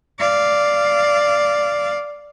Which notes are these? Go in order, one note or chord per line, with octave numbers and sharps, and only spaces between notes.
D5 F5